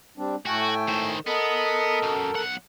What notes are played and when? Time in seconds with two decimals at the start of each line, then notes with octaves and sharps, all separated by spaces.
0.18 G3 C4 D4
0.46 A2 A3 F#4 G5 G#5
0.88 D#3 C5
1.27 B3 A4 A#4 D#5
2.02 F#2
2.35 B1 F#5